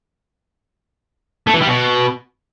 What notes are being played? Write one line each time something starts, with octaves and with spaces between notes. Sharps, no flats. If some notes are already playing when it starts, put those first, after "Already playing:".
A3
E3
G3
B2